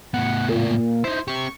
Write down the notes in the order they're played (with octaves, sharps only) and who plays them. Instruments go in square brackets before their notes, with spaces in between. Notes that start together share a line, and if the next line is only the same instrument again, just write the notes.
[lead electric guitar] A2 B3 [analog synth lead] F#5
[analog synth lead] A#2
[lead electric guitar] D#4 E4 [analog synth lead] C5
[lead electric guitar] C4 G4 [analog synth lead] C#6